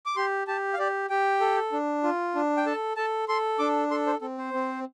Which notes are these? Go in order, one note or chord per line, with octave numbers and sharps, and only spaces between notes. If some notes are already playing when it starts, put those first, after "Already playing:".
D6
G4 C6
G4 A5
F5
G4 D5
G4 G5
A4
D4
F4
D4
G5
A4 A5
A4 A5
A4 C6
D4 D6
A4 C6
C5
C4 A4
C5
C4